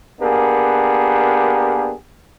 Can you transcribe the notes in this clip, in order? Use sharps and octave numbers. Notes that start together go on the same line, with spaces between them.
A#3 B3 D4 G4 G#4 A#4